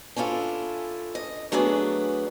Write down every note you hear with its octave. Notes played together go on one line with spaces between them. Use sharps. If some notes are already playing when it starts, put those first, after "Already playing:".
C#4 D4 E4 F4 A4
D#5
F#3 A3 B3 D4 G#4